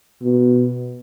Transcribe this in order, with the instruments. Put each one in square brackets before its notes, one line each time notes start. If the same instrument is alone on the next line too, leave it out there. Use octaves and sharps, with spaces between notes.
[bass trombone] B2